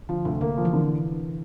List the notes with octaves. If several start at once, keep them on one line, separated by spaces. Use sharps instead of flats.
D3 F3
D2 C3
D3 A#3
F3
E3
D3